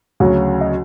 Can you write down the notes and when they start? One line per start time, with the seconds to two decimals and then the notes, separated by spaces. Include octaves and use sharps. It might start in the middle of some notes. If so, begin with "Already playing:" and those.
0.20 D2 C#3 F#3
0.61 D#5